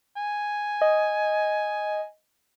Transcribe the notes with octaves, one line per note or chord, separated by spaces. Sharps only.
G#5
D#5